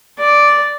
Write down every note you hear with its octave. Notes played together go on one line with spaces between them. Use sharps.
D5